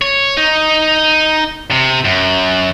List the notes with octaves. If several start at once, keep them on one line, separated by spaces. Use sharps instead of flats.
C#5
D#4
C3
F#2